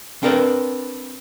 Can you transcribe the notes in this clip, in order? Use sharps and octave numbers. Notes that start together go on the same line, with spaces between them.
C4 D4 A#4 B4 G5